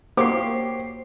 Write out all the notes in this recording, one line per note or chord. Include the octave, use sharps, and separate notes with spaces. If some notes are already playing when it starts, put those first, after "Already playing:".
A#3 F#4 G4 C5 C#5 D6 C7